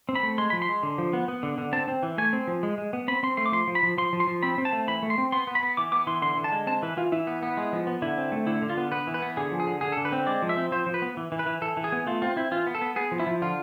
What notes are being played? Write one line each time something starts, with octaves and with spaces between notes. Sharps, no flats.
C4
B5
A3
G#3 C6
F3 B5
C6
G#3
D3
F3
B3
B3
D3
D3
C4 A5
C4
E3
A3 G#5
C4
F3
G#3
G#3
B3
C4 B5
C4 C6
A3 C6
D6
F3 C6
F3
B5
F3
F3 C6
F3
C6
F3
C4 B5
C4
A5
A3
E3 B5
A3
C6
C4
B3 C6
B3
B5
B3
E3 D6
B3 D6
E3 C6
D3 C6
D3
A5
G#3
C4 A5
E3 B4
E3 F4
E3 E4
B3
B3
G#3
F3
B3
D3 E4
C4
A3
D3 E4
D3
F4
B3
B3 B4
E3
B4
B3
D3 G#4
F3
G#4
D3
D3 G#4
D3 A4
B4
C4
G#3 D5
F3
E5
C4
F3 C5
F3
B4
B3
E3
E3
B4
E3
E3 A4
E3
G#4
B3
A3 F4
C4 F4
C4 E4
E3 F4
B3
A4
B3
B3 G#4
F3
E4
F3
D3 F4